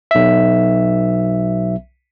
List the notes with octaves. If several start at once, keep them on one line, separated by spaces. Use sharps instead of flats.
B1 E5